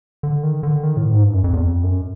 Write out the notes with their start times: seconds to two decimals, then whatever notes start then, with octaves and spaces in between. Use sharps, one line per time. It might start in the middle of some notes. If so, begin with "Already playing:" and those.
0.23 D3
0.43 D#3
0.63 D3
0.83 D#3
0.97 A2
1.10 G#2
1.23 G2
1.33 F#2
1.44 F2
1.53 E2
1.63 F2
1.83 F#2